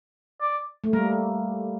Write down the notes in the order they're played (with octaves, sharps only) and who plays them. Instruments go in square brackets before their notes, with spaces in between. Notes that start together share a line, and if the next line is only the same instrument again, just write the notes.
[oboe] D5
[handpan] A3
[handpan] G3 A#3 [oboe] A#4